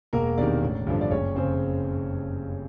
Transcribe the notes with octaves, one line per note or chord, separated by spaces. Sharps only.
E1 A#3 A#4
E2 C3 D#3 D4 D5
A1
G2 D3 F3
D5
F#1 C#4 C#5
F2 C#3 C4 C5